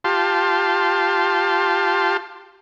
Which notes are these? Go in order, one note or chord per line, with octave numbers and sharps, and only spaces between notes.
F4 G4 A5 C6